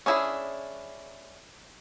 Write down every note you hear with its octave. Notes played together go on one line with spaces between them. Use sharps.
C#4 D4 E4 F#4 G#4